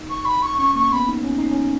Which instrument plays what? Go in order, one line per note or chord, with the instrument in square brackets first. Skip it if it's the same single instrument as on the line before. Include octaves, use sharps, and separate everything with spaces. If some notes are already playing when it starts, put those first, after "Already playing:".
Already playing: [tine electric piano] D#4
[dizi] C#6
B5
C#6
[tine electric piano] C#4 [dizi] C#6
[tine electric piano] A#3 [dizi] C#6
[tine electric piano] B3 [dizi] B5
[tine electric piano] D#4
C#4
D#4
C#4